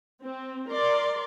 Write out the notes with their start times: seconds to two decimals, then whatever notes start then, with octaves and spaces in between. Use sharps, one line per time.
0.23 C4
0.71 A#4 D5 C6